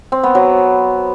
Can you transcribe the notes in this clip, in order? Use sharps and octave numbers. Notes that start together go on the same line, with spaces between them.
C4
B3
F#3